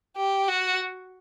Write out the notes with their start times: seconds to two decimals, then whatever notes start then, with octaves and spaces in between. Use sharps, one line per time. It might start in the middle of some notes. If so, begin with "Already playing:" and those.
0.17 G4
0.48 F#4